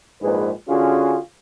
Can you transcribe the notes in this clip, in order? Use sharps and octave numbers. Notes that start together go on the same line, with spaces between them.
A#1 G#2 G#4 B4
D3 C#4 F4 F#4 G#4